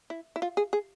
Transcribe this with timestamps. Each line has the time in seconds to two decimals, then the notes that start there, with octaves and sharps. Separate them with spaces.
0.10 E4
0.36 E4
0.42 F4
0.57 G#4
0.73 G#4